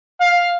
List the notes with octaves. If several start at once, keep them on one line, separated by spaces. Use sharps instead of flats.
F5